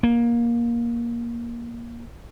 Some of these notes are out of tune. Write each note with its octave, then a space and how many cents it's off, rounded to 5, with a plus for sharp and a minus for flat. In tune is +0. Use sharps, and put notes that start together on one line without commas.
A#3 +15